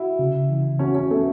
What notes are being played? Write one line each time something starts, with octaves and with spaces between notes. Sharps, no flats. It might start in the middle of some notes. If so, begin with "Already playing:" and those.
Already playing: E4 F#4
C#3
E3
C#4 F#4
C#4
A3 B3